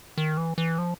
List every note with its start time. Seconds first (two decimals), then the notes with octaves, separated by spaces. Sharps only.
0.18 D#3
0.37 E3
0.58 E3
0.78 F3